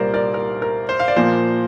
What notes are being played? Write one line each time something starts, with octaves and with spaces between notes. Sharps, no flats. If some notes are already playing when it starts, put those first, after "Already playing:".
Already playing: C2 A#2 G3 A#4 C5 D5 F5
A#4 D5
A#4
A#4
C5
F5
D5
A#2 F3 A#3 C5